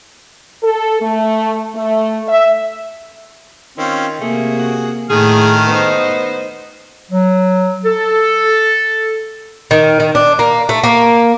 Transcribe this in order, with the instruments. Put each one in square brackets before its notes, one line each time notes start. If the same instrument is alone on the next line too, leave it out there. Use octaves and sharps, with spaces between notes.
[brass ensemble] A4
A3
A3
E5
[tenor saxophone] D#3 [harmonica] C4 C#4 F4
[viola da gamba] C3 A#3 [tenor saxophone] A3 [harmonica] G#4
[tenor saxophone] F#4
[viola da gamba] A2 [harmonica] D#3 A3 F6 [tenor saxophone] G#4
[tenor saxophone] B3 [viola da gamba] D#4 C5
[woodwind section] F#3
A4
[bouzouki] D#3
D#3
D4
A#3
A3
A#3